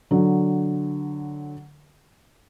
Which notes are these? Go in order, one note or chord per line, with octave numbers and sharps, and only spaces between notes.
D3 F#3